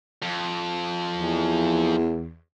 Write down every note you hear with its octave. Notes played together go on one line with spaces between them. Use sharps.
F2
E2